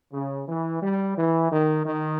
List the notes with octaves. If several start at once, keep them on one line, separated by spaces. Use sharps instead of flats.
C#3
E3
G3
E3
D#3
D#3